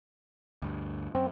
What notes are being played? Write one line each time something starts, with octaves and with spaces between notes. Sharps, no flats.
D2 G2
F#2 C4